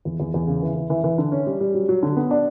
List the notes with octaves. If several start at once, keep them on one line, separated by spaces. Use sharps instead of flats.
E2
E2
E2
C#3
E3
E3
E3
E3
D3
C#4
G3
G3
F#3
F#3
D3
B3
D4